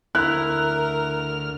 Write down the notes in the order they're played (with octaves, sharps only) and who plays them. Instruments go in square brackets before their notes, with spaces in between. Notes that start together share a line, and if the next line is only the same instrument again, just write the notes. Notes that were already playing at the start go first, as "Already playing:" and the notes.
[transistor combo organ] D2 F6 [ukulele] E4 [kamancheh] A#4 [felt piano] F#6